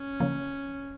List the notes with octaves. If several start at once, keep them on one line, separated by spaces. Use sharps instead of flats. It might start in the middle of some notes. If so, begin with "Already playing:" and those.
Already playing: C#4
C#3 F3 A#3